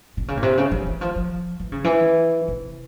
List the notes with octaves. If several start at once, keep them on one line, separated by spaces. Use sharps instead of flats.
C3
C#3
A#2
C3
C#3
E3
E3
F3
F3
E3
C#3
E3
C3